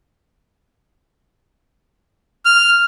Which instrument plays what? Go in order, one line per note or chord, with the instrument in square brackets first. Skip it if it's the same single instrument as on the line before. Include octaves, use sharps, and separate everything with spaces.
[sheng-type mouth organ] F6